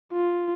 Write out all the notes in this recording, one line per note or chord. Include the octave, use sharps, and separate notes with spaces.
F4